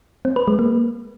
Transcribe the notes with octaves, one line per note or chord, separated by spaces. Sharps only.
C4
B4
G#3
A#3